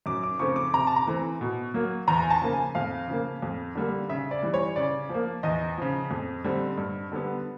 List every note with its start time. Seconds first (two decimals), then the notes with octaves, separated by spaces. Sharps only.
0.06 F#2 D6
0.24 D6
0.39 C#3 F3 A3 C4 C#6
0.56 D6
0.74 C3 A#5
0.87 A5
0.96 A#5
1.07 E3 A3 C4
1.41 B2
1.74 F#3 A#3
2.08 E2 A#5
2.22 G#5
2.30 A5
2.42 C#3 F3 A#3
2.53 G#5
2.75 F2 F5
3.08 C#3 F3 A#3
3.42 F2
3.75 D3 G3 A#3
4.10 C#3 E5
4.31 D5
4.42 E3 G3
4.54 C#5
4.76 C#3 D5
5.09 F3 A#3
5.43 E2 D#5
5.78 C#3 F3
6.11 F2
6.44 D3 G3 C4
6.78 G2
7.12 D3 G3 B3